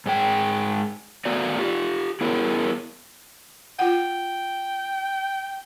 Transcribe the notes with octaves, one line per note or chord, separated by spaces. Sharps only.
G#2 G#3 G5
A3 B3 F#4 D5
F4 G4
B3 E4 G#4 A#4
F4 F#5 G5